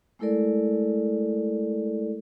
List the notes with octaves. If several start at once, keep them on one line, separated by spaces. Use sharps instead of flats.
G#3 A3 E4 A4 A#4 D5